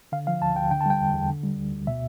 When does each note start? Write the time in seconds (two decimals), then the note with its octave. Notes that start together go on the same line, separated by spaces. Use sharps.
0.12 D3 F5
0.27 F3 F5
0.41 D2 A5
0.56 D2 G5
0.71 D3 G5
0.81 A5
0.86 G3 G5
1.00 E2
1.14 E2
1.29 D3
1.43 G3
1.58 D2
1.72 D2
1.87 B2 E5